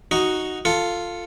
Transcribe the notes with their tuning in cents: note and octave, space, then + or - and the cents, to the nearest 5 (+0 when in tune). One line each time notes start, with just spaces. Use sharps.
D#4 +0 F#4 +0
F4 +0 A4 +10